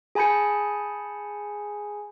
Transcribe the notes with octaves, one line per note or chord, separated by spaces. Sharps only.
G#4 G#5 A5 B5 G6 C#7